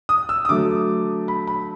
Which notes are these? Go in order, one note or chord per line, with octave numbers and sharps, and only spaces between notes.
D#6
E6
D#6
D3 F#3 A3 D6
B5
B5